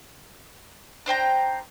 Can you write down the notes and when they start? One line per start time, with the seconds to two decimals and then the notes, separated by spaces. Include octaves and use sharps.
1.06 D4 C5 G5 A#5